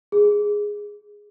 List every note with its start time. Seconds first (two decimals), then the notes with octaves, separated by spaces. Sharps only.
0.12 G#4